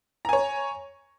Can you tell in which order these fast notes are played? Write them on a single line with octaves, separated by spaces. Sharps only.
A#5 G#5 C#5